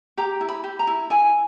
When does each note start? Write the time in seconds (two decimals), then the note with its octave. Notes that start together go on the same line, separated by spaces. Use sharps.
0.17 G4 A#5
0.41 E4
0.49 B5
0.64 G4
0.79 A#5
0.87 E4
1.10 E4 G#5